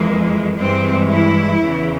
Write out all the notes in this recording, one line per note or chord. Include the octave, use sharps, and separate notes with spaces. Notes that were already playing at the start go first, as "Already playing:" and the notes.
Already playing: F2 E3 G#3 A#3
G2 E3 G#3 C4
E4
E2 C#3 E3